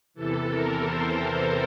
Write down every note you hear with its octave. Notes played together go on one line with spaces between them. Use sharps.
E2 C3 E3 A4
A#4
C5